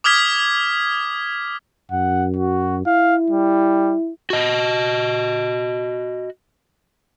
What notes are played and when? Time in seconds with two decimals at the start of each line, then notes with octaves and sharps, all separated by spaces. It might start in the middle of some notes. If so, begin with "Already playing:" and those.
0.04 D6 D#6 F6 G#6 B6
1.91 F#2 F#5
2.36 F#4
2.86 E4 F5
3.30 G3
4.30 F#4 D#5